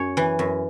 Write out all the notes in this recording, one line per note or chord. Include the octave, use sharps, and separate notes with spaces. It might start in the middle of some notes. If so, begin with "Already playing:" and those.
Already playing: F#2 C#5
E3
F#2